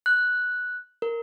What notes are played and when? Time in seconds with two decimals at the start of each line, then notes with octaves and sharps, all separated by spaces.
0.06 F#6
1.02 A#4